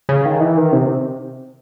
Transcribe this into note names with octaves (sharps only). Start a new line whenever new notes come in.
C#3
D#3
E3
D#3
C3